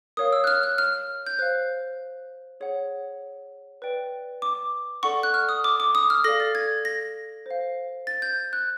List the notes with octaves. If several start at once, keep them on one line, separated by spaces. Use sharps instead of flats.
A#4 C#5 F5 D#6
E6
F#6
F6
F#6
F6
G6
C5 F5 F#6
G#4 C#5 F#5
B4 D5 G5
D6
A4 D5 F#5 C#6
F#6
F6
D#6
D6
D6
D#6
F6
A4 D5 F5 A#6
A6
G#6
A#6
C5 F5
A6
G6
F#6